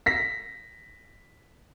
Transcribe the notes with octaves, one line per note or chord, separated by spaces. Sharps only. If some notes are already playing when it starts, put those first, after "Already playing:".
A#6 B6